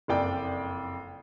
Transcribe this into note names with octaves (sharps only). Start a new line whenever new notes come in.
F#1 F2 D5 G5